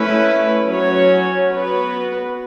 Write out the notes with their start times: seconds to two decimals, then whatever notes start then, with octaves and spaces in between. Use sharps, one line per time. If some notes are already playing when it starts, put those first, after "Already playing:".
Already playing: A3 C#4 E4 B4
0.67 F#3 C#4 F#4 C#5
1.48 B3 F#4 B4